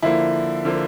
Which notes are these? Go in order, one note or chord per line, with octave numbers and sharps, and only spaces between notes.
D3 F3 A#3 E4
D3 F3 A#3